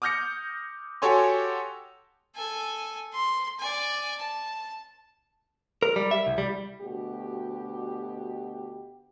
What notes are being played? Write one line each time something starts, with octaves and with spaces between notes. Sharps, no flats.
D6 D#6 F6 G6 A#6 C#7
F#4 G4 A4 C#5 G#5 C6
A4 G#5
C6
D5 G#5
A5
A#4
G3
E5
C2
G3
D2 B2 G4